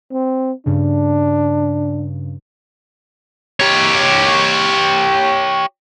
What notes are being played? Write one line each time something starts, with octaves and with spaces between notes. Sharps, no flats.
C4
G2 C#3 D4
G4 C#5